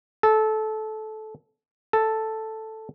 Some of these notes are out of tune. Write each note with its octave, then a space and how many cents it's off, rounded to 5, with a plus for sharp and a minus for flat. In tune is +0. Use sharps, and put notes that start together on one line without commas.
A4 -20
A4 +0